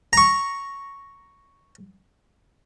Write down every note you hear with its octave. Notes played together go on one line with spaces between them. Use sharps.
A#5 C#6